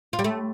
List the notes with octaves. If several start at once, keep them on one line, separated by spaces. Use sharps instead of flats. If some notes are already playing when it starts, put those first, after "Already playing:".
F4
G3
A3